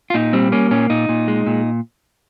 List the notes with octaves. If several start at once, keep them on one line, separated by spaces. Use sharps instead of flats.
F4
A#2 D#4
G3 C4
A#3 C#4
A#2 C#4
A#2 D#4
A#2
G#3
A#2